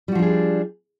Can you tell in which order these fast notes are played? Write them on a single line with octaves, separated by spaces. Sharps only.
G3 F#4 F3 D4 G#4